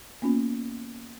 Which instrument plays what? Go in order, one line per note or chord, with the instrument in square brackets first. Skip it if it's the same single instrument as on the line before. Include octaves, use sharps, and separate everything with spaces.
[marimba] A#3 B3 C#4 F4